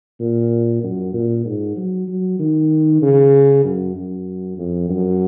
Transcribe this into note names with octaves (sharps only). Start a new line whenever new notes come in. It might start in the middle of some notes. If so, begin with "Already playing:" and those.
A#2
F#2
A#2
G#2
F#3
F#3
D#3
C#3
F#2
F#2
F2
F#2